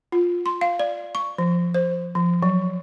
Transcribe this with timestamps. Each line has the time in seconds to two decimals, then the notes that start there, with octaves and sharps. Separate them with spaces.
0.12 F4
0.46 C6
0.61 F5
0.80 D5
1.15 C#6
1.38 F3
1.74 C5
2.15 F3
2.43 F#3